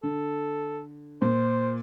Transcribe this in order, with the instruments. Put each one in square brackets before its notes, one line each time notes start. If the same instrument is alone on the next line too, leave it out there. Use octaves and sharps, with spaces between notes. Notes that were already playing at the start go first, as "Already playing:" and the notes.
[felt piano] D3 [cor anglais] A4
[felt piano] A#2 [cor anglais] C5